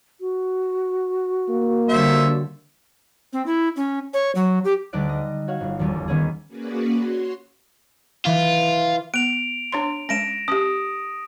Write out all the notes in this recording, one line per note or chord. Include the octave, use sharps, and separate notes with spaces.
F#4
A#3
D3 G3 C5 C#5 E5
C4
E4
C#4
C#5
F#3
G4
D2 G3 D#4 D5 F#6 D7
D#5
F#4 C#5 F5 F#5
G1
E1 D#2 G3 C#4
D#3 B3 C#4 G#4
A#3 C#4 F#4 G#4 B4 D5
F#4 C#5 C6
E3 F4
B3 D7 F7
D4 C#5 C6
G#3 C#4 A#6 D7 E7
C#4 G4 D#6